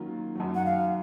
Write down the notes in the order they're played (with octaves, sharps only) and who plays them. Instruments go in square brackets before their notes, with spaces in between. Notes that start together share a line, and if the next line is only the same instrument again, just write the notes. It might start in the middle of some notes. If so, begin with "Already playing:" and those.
Already playing: [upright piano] D#3 F#3 A#3 C#4 F4
F#2 D#3 F#3
[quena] F#5
F5